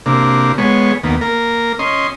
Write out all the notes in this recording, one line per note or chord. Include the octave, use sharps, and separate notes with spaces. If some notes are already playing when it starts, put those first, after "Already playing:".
C3 A#3 D4
G#3 B3 C#5
D#2 A#3 B3
A#3 A#4
C#4 D#5 C6